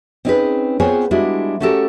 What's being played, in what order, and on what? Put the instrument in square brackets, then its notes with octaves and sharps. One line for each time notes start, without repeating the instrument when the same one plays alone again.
[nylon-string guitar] C4 C#4 D#4 G4 G#4 B4
B3 C4 F4 G#4 C5 C#5
G3 G#3 D4 E4 F#4
A3 C#4 F#4 G4 A4 A#4